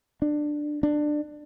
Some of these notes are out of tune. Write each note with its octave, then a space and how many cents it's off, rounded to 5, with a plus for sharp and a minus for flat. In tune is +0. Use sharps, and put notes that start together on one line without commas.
D4 +15
D4 +20